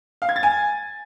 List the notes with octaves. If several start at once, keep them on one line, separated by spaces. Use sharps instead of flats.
F5
G#6
A6
G#5